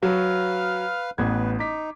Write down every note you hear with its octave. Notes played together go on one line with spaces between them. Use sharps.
F#3 B4 F5 F6
A1 B3 B4 G#6
D#4 D6 B6